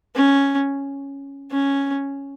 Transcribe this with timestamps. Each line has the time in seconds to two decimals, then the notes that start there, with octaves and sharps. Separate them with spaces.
0.16 C#4
1.51 C#4